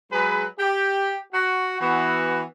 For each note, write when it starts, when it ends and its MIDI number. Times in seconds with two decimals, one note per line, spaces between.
0.11 0.44 54
0.11 0.44 56
0.11 0.44 68
0.11 0.44 71
0.58 1.17 67
1.33 1.79 66
1.81 2.43 52
1.81 2.43 59
1.81 2.43 66